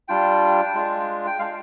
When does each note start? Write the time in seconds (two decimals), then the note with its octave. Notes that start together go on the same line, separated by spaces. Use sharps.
0.08 G3 D4 F4 G5
0.74 G#3 D4 F4
1.27 G5
1.39 G#3 D4 F4 F5